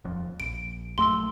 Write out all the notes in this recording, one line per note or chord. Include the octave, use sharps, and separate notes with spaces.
D#1 F2
A#1 D7
A#1 F#2 A3 C6 E6